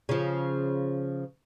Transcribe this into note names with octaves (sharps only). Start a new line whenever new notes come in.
C#3 F3